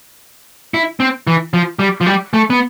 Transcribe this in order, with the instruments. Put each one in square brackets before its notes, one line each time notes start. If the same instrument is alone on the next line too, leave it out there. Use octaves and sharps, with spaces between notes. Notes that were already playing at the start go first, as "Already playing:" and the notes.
[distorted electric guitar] E4
C4
E3
F3
G3
F3
G3
A3
B3